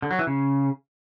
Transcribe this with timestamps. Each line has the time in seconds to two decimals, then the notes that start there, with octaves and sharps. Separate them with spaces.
0.02 D3
0.11 F#3
0.19 E3
0.27 C#3